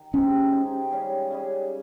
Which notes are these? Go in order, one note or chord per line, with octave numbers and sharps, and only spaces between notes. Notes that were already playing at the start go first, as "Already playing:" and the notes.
Already playing: D#3
G#3 C4 C#4 D#4 G4
G#3 C4 D#4 G4
C#3 G3 C#4 G#4
C#3 G3 C#4 G#4